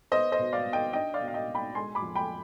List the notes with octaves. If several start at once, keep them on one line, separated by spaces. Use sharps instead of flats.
B3 C5 D#5
C5 D#5
B2
D5 F5
B2
D#5 G5
D4 D#5 G5
D5 F5
B2
F5
D#5 G5
B2
G5 B5
G#3 G#5 C6
B5 D6
F2
G5 B5